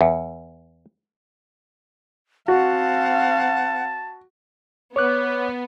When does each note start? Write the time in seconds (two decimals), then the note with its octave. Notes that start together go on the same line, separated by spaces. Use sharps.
0.01 E2
2.48 C4 F#4 F5 F#5 A5
4.96 B3 C#5 D6 F#6